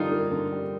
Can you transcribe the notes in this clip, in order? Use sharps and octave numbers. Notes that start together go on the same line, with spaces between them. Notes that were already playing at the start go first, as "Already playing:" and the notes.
Already playing: D3 G3 A#3 D#4 F4
A#3
D3
G3